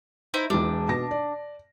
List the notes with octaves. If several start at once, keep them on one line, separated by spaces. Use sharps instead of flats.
D#4 E4 C5
E1 E2 G#3 D4
B2 A5 A#6
D5